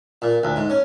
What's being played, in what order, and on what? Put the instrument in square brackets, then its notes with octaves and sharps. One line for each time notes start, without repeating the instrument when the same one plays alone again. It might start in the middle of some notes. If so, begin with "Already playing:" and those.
[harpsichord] A#2
D2
G#2
C#4